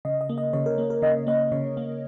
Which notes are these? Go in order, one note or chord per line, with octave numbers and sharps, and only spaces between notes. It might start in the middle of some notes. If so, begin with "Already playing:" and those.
C#3 D#5
D#5
A#3
D#5
C#3 C#5
A#4
A#3
A#4
C#3 D#5
A#3 D#5
C#3 C#5
A#3